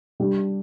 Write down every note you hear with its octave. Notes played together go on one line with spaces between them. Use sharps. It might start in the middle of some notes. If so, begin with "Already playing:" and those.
G3 D4 G4